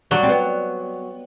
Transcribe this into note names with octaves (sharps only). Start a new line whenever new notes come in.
F#3 G3
C4
B3